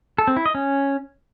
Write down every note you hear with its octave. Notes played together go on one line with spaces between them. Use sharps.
A4
C4
E4
D#5
C#4